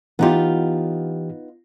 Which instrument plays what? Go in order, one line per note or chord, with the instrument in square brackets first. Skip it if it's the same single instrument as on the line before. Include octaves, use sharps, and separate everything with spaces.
[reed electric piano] E3 G4 [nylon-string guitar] B3 D#4 F4